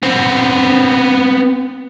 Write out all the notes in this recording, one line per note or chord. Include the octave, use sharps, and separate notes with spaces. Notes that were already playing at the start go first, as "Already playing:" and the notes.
B3 C4